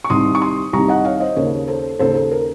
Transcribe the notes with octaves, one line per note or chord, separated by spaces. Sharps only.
C#6
C2 C3 D#3 C6 D#6
C#6
C6 D#6
C2 C3 D#3 A#5 C#6
D#5 F#5
C#5 F5
C5 D#5
D#2 C#3 A#4 C#5
A4 C5
D#2 C#3 A4 C5
A4
A#4